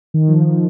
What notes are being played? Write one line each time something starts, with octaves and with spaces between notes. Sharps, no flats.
D#3
F3
F3